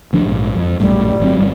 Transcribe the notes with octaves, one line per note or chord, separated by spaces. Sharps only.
D2 F3 D4
A#1 G#2
F2
A#1 F#2 A2 G3
G1 F#3 C4
G1 C#3 F#3